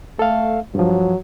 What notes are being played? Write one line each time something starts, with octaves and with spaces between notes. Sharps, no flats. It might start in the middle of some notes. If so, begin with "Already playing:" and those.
A3 A4 F5
G2 F3 F#3